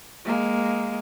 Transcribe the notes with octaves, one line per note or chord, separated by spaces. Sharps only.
G#3 A#3